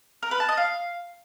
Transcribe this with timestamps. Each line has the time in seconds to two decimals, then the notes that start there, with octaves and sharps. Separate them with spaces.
0.23 A#4
0.31 B4
0.40 A5
0.49 D#5
0.57 F5